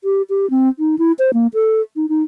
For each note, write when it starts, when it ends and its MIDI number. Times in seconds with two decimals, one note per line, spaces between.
0.04 0.22 67
0.30 0.49 67
0.50 0.68 60
0.79 0.96 63
0.99 1.12 64
1.19 1.31 72
1.34 1.47 58
1.54 1.81 69
1.96 2.06 63
2.09 2.23 63